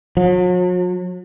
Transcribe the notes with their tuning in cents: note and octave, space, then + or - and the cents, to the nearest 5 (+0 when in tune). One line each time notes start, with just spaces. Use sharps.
F#3 -45